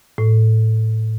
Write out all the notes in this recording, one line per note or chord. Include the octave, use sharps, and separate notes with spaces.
A2